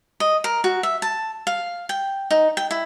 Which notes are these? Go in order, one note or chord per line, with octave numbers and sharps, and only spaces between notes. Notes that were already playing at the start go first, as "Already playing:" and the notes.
D#5
A#4
F#4
E5
A5
F5
G5
D#4
G5
E4